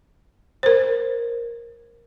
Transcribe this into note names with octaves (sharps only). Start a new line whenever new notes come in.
A#4 C5